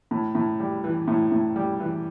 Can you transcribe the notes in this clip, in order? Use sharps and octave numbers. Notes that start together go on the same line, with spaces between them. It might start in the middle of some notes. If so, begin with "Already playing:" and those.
A2
A2
G3
E3
A2
A2
G3
E3